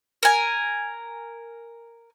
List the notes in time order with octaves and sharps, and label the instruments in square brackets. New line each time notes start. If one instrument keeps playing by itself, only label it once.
[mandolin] A#4 G#5